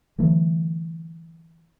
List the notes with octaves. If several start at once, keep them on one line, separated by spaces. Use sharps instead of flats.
D3 E3 F#3 A3